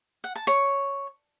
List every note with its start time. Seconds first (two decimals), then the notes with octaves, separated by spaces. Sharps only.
0.24 F#5
0.36 A5
0.47 C#5